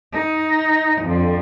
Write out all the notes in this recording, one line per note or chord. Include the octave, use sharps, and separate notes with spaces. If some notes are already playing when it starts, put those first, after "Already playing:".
D#4
F2 D3